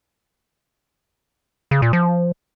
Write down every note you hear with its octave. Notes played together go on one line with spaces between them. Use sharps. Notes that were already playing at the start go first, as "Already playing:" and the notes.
C#3
A#2
F3